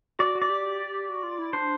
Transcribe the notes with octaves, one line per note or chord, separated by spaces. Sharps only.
F#4 D5
F#4
D5
G4
F#4
F4
E4
D4 C5